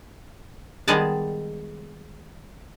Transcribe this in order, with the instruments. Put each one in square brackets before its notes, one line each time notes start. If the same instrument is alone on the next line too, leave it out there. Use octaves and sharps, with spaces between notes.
[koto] D#3 G3 G#3 B3 G#4 A5